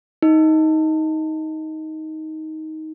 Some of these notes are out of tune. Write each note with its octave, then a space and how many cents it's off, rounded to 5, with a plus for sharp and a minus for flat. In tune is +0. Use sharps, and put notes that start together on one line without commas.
D#4 +15